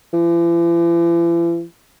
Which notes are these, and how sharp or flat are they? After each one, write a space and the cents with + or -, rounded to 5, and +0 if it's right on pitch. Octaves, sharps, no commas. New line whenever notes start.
E3 +45